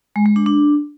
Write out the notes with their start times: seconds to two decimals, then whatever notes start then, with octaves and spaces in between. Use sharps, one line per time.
0.16 G#3
0.26 G#3
0.36 D4
0.46 D4